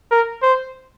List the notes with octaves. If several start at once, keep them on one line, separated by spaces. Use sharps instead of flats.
A#4
C5